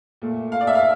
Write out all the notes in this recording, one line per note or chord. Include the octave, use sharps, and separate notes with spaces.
A#2 A3
F5
D5
E5
F5